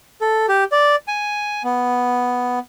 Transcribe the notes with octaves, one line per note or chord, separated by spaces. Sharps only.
A4
G4
D5
G#5
B3